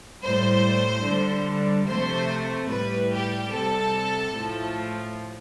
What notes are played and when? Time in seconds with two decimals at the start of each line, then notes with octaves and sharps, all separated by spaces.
0.22 A2 G3 C5
1.04 D3 G3
1.87 C3 F3 A3 C5
2.69 A2 G3 B4
3.11 G4
3.51 C3 G3 A4
4.34 A2 F3 A3